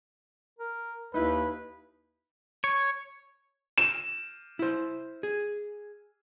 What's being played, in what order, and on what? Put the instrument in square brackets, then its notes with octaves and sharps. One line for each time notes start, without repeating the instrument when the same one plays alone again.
[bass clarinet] A#4
[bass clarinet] D#2 [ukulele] D#4 E4 [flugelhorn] B4
[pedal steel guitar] C#5
[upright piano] E7
[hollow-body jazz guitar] E4 C5
G#4